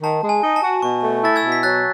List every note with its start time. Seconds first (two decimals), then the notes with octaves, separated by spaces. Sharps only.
0.03 D#3 A5
0.22 G#3
0.29 G#5
0.44 D#4
0.56 A5
0.62 F#4
0.82 B2 C#6
1.04 A3
1.23 E4 A6
1.36 E6 G#6
1.44 B2
1.52 B6
1.63 F#3 F#6 A6